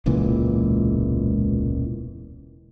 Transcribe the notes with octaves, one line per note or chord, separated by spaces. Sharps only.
E1 C#2 A#2 E3